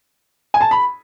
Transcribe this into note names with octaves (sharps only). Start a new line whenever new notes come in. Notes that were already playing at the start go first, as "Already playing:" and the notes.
G#5
A5
B5